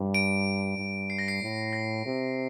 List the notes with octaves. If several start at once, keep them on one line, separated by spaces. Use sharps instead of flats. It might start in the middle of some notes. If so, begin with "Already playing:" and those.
Already playing: G2
D7
G2
C7
A#6
C7
A2
A#6
C3